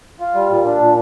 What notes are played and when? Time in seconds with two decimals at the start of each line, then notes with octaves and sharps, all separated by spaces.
0.20 F4
0.35 G3
0.50 A#2
0.65 D4
0.80 A#2